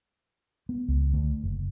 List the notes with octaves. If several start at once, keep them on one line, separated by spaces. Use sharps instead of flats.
B3
C#2
D2
F#1